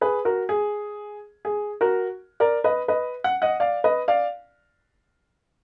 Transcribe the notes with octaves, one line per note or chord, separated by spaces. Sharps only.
G#4 B4
F#4 A#4
G#4
G#4
F#4 A#4
A#4 D5
B4 D#5
B4 D#5
F#5
D#5 F#5
D5 F5
B4 D#5
D5 F5